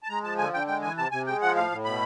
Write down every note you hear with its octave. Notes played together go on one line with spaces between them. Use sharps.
A5
G#3 A#5
F3 A5
D3 G#5
D3 G5
G#3 G5
E3 G#5
C3 A5
C3 G#5
G#3 G5
F3 F#5
A2 F5
A2
B2 B5